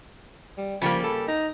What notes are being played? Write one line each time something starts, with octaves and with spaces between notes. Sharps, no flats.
G3
C#3 F3 G3 A#3
A4
D#4